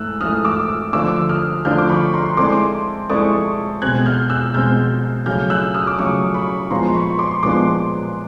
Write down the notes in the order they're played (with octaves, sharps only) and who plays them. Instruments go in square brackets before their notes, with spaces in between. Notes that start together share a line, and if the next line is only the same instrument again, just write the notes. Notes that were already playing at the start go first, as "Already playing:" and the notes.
Already playing: [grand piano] G#2 E3 A3 [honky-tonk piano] E6 F#6
[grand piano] G#2 E3 A3 [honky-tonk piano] D#6 F6
[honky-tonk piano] D6 E6
[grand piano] D3 F3 A3 D4 [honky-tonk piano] D6 E6
[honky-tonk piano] D#6 F6
[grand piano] D3 F3 A3 D4 [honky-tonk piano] F6 G6
[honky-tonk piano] D6
B5 C#6
A#5 C6
[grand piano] G#3 C4 E4 A4 D5 [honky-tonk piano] C6 D6
[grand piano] G#3 C4 E4 A4 D5 [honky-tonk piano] C#6 D#6
[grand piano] B2 G#3 C4 [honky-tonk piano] F#6 G#6
[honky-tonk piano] F6 G6
E6 F#6
[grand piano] B2 G#3 C4 [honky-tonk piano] F6 G6
[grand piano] C#3 F#3 A3 C#4 [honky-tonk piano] F6 G6
[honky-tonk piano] E6 F#6
D#6 F6
D6
[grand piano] C#3 F#3 A3 C#4 [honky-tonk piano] C#6 D#6
[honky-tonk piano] B5 C#6
[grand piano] A#2 F3 G#3 B3 D4 [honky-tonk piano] A#5 C6
[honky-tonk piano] B5 C#6
C6 D6
[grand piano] A#2 F3 G#3 B3 D4 [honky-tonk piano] C6 D6